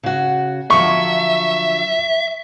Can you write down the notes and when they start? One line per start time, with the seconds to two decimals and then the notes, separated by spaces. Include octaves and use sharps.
0.03 C#3 F#4
0.70 D3 F3 F#3 E5 C#6